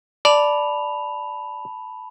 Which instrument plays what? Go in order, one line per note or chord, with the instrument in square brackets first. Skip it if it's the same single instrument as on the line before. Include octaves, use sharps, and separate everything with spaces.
[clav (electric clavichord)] D5 [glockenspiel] A5 B5 F7